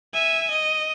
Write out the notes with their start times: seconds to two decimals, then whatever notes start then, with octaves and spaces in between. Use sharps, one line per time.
0.13 E5 G#5
0.50 D#5